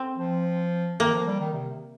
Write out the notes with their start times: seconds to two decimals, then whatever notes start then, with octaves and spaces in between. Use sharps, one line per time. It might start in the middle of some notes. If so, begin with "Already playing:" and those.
Already playing: C4
0.18 F3
1.00 D#3 A#3
1.13 F3
1.27 G3
1.40 D#3
1.54 C3